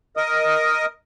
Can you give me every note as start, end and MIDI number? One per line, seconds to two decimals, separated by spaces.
0.17 0.86 70
0.17 0.86 75
0.17 0.86 87